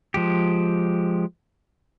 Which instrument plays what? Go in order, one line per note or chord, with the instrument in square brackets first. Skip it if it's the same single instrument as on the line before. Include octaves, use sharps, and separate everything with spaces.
[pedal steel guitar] F3 G#3 G4